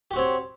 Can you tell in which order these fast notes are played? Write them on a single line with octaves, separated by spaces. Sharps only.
G4 F#4 C4 C#5